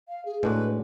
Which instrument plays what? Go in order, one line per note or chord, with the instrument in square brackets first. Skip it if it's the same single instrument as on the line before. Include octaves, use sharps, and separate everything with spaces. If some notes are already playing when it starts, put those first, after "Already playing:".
[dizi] F5
G#4
[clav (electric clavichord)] A2 G#3 D4 F#4 [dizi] B4